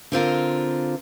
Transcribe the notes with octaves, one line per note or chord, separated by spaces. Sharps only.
D3 C4 F4 A#4